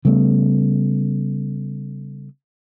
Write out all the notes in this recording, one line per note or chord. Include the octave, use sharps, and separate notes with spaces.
C#3 G3 A3 B3